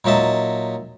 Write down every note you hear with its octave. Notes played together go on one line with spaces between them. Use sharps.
A#2 F#3 D#4 E5 A5